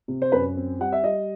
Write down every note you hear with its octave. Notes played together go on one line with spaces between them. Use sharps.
C3
C5
F#2 B4
C4
G3 F#5
E5
G3 D#5